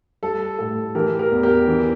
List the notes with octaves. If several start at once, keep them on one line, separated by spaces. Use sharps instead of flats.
G3 A4
A2 A4
E3 G4 A#4
G4 A#4
E2
G4 A#4
E3